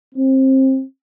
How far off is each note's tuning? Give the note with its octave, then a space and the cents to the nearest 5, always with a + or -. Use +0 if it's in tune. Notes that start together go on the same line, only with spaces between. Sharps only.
C4 +25